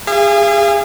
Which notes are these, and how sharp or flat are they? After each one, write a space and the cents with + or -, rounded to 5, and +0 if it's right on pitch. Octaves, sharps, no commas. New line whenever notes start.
G#4 -30 F5 -40